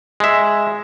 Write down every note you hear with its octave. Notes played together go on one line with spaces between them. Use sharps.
G#3 E5